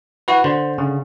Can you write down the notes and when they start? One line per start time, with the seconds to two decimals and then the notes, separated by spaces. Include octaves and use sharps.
0.28 E4 F#4 B4
0.44 D3 C5
0.78 C#3